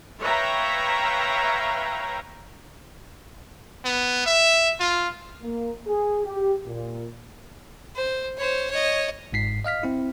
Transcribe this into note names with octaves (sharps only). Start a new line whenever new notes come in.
B4 C#5 E5 F5 G5 A#5
B3
E5
F4
A#3
G#4
G4
A#2
C5
C5 C#5
C#5 D#5
G1 G#2 B6 C7
D#5 F5 F6 B6
C4 E4